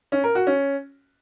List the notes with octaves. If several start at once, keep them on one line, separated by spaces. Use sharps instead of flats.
C#4
A#4
F#4
C#4